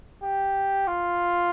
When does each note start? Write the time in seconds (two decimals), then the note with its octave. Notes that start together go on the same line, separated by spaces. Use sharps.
0.23 G4
0.87 F4